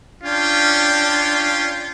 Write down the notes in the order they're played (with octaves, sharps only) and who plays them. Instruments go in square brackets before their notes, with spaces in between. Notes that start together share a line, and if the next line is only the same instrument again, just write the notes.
[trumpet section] C#4 F4 G5 [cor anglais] D4